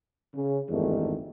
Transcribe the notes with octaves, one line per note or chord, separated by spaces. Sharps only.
C#3
G#1 E2 G2 D#3 A3